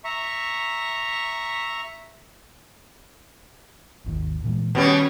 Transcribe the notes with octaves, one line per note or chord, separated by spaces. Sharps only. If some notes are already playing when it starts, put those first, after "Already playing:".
E5 A#5 C#6
G#1 D#2 D#3
A#2 E3 G#3
B2 D#3 G3 C#4